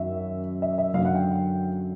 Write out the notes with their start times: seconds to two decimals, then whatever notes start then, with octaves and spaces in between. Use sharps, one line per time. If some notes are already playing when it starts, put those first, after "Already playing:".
Already playing: F#2 D#3 F#3 E5
0.62 E5
0.78 E5
0.94 F#2 D3 F#3 F5
1.05 F#5
1.15 G5